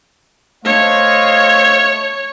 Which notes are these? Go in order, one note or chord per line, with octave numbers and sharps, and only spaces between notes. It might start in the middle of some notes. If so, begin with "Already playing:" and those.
A3 C5 C#5 D#5 F5